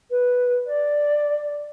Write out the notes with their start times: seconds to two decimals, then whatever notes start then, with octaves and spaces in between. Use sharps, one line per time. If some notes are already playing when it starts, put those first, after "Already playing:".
0.10 B4
0.66 D5